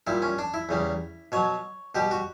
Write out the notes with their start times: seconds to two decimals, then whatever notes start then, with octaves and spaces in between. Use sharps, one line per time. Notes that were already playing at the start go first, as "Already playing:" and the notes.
0.07 A#2 G3 E4
0.22 C#4
0.39 D4
0.54 E4
0.69 E2 C#3 G3
1.32 B2 F#3 C#5
1.95 B2 G3 G4
2.11 F#4